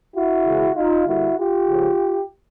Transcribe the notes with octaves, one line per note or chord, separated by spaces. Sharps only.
E4 F#4
C#3 E3 G#3
D#4 F4
D3 G3 A#3 E4 F#4
F4 G4
C#3 F3 G#3